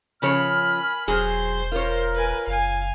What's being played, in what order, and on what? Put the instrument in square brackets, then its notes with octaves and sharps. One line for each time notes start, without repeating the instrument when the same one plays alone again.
[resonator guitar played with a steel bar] C#3 F3 C#5 [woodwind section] A#4 G#5 F6 [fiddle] B5
[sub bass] E1 [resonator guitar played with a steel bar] F#3 G#4 [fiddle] C5 C6
[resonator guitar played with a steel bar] F4 C#5 [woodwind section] A#4
[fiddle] B4 G#5
[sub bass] F#1 [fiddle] F5 G#5